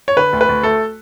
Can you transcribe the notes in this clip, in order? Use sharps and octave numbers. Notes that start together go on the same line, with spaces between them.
C#5
D3 B4
D2
B4
D2
A3 A4